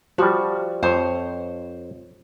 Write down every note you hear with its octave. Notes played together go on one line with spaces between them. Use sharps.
F3 G3 F#4
F2 C5 C#5